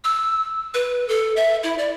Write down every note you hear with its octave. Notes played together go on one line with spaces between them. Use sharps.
E6
B4
A4
E5
E4
D5